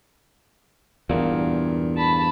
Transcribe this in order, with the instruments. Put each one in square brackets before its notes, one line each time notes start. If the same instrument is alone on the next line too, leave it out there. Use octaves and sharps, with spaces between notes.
[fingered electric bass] E2 G2 [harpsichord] A#2
[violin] A5 B5